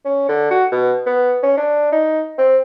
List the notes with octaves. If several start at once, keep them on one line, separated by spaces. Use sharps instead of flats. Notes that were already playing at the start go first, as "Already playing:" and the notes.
C#4
D3
F#4
B2
B3
C#4
D4
D#4
C4